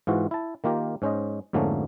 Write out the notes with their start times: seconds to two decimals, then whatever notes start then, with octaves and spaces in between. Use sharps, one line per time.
0.07 G#2 E3 F4 F#4
0.31 E4 A5
0.64 D#3 A#3 F4 G4 A#4
1.02 G#2 C#4 C5 D#5
1.53 F2 G#2 D3 A3 A#3 C#4